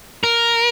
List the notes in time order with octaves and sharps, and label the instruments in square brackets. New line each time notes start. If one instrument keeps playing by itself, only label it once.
[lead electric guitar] A#4